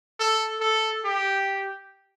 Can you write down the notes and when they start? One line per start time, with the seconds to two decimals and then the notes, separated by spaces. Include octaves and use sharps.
0.19 A4
0.61 A4
1.05 G4